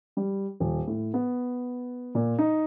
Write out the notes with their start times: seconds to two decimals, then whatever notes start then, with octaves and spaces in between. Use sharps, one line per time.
0.17 G3
0.60 D#1
0.87 A2
1.14 B3
2.15 A#2
2.39 D#4